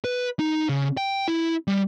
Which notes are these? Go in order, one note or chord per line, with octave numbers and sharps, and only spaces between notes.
B4
D#4
C#3
G5
E4
G3